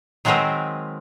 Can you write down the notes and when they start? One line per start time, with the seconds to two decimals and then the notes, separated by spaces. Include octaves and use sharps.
0.25 D#3 F#3 G#3 C4 A#4 B4